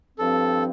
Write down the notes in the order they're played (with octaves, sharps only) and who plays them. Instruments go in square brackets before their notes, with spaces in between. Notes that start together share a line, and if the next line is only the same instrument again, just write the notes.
[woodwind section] G2 F3 C4 [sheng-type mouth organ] A4